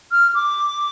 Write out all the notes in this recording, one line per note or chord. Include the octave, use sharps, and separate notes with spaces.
F6
D6